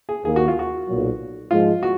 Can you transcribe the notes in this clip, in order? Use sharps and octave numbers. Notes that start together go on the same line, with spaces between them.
G#4
D#2 D#3 A#3 G#4
F#4
F4
F#4
B1 A#2 F#3
G#2 F3 G#3 F4
F#4